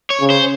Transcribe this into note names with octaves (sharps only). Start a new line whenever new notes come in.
C#5
C#3
C5